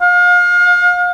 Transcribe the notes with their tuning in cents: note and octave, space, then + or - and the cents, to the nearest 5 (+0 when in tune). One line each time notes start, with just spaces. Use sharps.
F5 +35